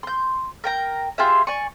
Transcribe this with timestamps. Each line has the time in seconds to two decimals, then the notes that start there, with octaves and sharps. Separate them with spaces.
0.03 C6 G6
0.64 A#4 G5 A#5
1.18 F4 G4 G#4 E5
1.47 D5 G#5 C#6